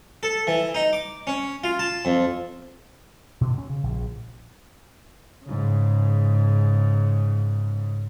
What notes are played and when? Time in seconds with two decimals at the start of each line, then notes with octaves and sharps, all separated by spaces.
0.23 A4
0.47 E3
0.75 D#4
0.93 D6
1.27 C#4
1.64 F4
1.79 A5
2.05 F2
3.41 B2
3.58 C#4
3.69 C#3
3.84 A#1
5.45 G#2 C#3